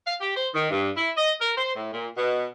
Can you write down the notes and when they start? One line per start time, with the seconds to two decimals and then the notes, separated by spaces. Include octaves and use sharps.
0.05 F5
0.21 G4
0.36 C5
0.54 D#3
0.70 G2
0.95 E4
1.16 D#5
1.40 A#4
1.56 C5
1.75 A2
1.92 A#2
2.17 B2